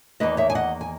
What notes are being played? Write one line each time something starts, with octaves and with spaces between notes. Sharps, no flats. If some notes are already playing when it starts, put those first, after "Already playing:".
E2 D#3 A#3 D#4 B4 D#5
C#5 E5
G#5
D#5 F#5
G#5